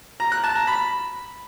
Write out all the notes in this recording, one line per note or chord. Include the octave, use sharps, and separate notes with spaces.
A#5
F#6
A5
A#5
B5